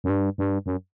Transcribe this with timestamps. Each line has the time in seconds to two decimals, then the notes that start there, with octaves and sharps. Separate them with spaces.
0.04 F#2
0.10 G2
0.38 G2
0.66 F#2